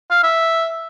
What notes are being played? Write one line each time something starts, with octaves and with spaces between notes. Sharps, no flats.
F5
E5